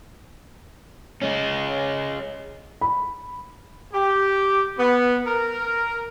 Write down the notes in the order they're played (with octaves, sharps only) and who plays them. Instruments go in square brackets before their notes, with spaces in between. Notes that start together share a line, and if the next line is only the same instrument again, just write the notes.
[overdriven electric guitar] G#3 C#4
[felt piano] B5
[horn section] G4
B3
A#4